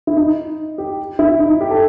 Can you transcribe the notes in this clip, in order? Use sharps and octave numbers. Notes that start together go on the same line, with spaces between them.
E4
D#4
G4
E4
D#4
G4
A4